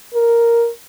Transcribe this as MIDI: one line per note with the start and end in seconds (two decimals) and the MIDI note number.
0.14 0.69 70